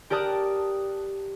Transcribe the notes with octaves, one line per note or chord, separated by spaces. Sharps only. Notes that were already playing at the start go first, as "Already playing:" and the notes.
G4 A#4 D5 A5 D#6 F#6